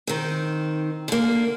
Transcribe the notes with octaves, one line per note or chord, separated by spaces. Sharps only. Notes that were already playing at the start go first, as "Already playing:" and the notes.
D#3 C4
D3 A#3